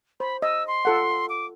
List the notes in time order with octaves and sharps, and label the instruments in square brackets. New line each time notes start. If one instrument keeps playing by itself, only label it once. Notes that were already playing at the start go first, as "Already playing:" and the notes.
[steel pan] C5 [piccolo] B5
[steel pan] D#5 [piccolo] E6
[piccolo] C6
[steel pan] F4 A4 F#5
[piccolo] D6